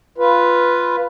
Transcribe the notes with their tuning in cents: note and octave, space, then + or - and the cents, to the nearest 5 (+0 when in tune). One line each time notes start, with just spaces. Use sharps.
F4 +0 B4 +0